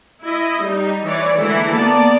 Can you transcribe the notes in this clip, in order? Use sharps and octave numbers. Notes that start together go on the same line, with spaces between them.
E4 D#5
G3 D#4
E3 C#5 D5
D3 E3 G#3 A#3 E4
A#3 B3 D5 A5